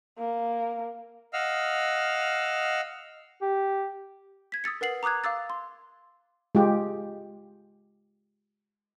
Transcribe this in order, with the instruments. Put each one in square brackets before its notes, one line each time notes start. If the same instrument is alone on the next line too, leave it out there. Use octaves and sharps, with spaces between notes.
[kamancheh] A#3
[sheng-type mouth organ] D#5 F5 F#5 E6 F6
[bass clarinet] G4
[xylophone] G#6 B6
D#6 E6 A6 C#7
A#4 B4 F#5 C7 F#7
A#5 D6 D#6 F#6 G#6
F5 D6 E6 A6
C6
[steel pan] G#3 F4 G4